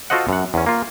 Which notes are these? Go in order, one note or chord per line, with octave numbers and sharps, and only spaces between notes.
F4 F#4 A4 C5 D#5 F#5
F#2 F#5
E2 C#4
A#3 F4